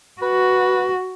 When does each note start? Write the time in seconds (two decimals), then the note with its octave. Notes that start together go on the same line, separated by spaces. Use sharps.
0.22 F#4 B4